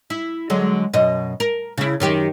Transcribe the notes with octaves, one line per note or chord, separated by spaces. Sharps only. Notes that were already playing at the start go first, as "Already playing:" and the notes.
E4
D3 F#3 G#3
F#2 B2 D#5
A#4
C#3 E4
F#2 D#3 G4